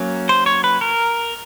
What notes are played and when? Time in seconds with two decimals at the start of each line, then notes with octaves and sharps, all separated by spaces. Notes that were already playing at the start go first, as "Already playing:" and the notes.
Already playing: F#3 A#3 C#4
0.29 C5
0.46 C#5
0.64 B4
0.81 A#4